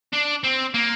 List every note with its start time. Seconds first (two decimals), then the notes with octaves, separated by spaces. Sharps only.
0.13 D4
0.44 C4
0.74 A#3